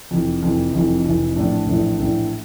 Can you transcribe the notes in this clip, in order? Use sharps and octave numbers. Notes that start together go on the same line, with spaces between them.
F1 F2 E3
F1 F2 E3
F1 F2 E3
F1 F2 E3
A#1 A2 E3 A3 D4
A#1 A2 E3 A3 D4
A#1 A2 E3 A3 D4